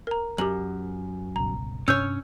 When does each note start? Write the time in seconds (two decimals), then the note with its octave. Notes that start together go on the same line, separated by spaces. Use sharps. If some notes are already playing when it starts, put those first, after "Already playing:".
0.07 A#4 A#5
0.38 F#2 G4 F#7
1.36 G1 C#2 B2 A#5
1.88 G2 C3 C#4 D4 C#5 E6 G6